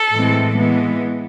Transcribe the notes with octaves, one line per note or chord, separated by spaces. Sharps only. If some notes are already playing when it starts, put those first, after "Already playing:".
Already playing: A4
A2 E3 G#3 C4
E3 G#3 B3